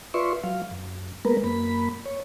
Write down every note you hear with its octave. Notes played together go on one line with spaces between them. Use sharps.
F4 B4 D5 E5 C6 C#6
F#3 F5
F#2
G#3 A#3 B3 A#4 B4
F#2 A#3 B5
C#5